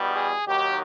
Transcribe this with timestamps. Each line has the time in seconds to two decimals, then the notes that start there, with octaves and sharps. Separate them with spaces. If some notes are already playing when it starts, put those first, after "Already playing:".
Already playing: E2 B2 G3
0.16 G#4
0.47 D#2 D#3 F#3 G4